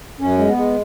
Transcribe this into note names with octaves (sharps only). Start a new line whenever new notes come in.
F#2 C#4
G#3
B3
G#3